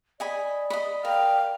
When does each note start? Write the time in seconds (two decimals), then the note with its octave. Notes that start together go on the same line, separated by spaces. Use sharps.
0.20 D5 D#5 G#5 B5
0.70 D#5 B5
1.05 A#4 F5 G5